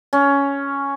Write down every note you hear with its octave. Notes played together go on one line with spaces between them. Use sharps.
C#4